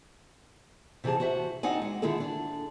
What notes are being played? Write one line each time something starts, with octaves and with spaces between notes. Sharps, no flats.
C3 E3 G4 G#4 A5
F#4 C5 E5
C4 D4 D#4 F#5 G#5
G#3
D3 D#3 E4 F4 G#4 A4
D4